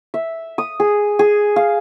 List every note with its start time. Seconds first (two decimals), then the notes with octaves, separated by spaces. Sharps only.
0.14 E5
0.58 D#6
0.80 G#4
1.19 G#4
1.56 F5